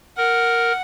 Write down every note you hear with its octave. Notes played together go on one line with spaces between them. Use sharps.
A#4 F#5